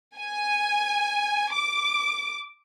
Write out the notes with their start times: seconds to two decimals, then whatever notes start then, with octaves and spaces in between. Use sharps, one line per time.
0.17 G#5
1.54 D6